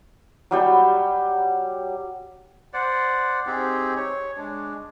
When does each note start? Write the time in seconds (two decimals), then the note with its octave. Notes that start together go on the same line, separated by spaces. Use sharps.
0.51 F#3 G3 G5
2.74 C5 D5 F#5
3.46 C4 D#4 G4 G#4
3.96 C#5
4.37 G#3 D4